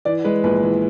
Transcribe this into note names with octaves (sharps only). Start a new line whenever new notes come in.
E3 D5
G#3 B4
A#1 B4
E3